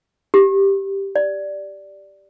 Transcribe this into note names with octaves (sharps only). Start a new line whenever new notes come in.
G4
D5